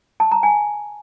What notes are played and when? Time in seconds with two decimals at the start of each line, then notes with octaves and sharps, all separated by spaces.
0.20 A5
0.32 A#5
0.43 G#5